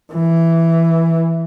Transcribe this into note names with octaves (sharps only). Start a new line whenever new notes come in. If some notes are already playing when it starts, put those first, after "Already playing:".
E3